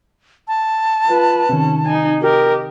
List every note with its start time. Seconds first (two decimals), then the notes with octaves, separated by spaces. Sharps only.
0.48 A5
1.06 F4 B4
1.49 C3 D#3 C#4
1.86 D#4 G#5
2.22 G4 A#4 D#5